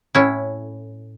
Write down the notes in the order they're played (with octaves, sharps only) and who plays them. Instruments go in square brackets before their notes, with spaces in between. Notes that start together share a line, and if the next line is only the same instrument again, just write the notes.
[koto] A2 C#4 E4